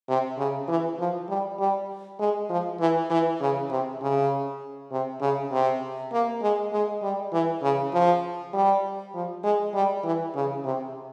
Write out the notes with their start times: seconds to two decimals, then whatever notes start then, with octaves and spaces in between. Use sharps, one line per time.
0.09 C3
0.38 C#3
0.68 E3
0.98 F3
1.29 G3
1.59 G3
2.19 G#3
2.49 F3
2.80 E3
3.10 E3
3.40 C#3
3.70 C3
4.01 C#3
4.92 C3
5.21 C#3
5.52 C3
6.12 A#3
6.42 G#3
6.73 G#3
7.02 G3
7.33 E3
7.62 C#3
7.93 F3
8.54 G3
9.14 F3
9.43 G#3
9.74 G3
10.04 E3
10.35 C#3
10.64 C3